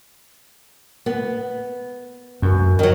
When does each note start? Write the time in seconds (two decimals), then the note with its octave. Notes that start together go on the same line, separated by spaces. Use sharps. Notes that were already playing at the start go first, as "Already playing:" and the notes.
1.06 B3
2.42 F#2
2.79 D#3 F#3